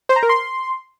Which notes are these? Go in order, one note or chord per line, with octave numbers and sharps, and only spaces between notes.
C5
A#5
A#4
C6